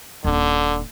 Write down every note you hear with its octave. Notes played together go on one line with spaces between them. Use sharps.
D#1 D3 D4